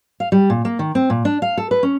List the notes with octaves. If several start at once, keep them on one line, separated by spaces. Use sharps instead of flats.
F5
G3
A#2
A#3
D#3
C4
A#2
D4
F5
A4
B4
C#4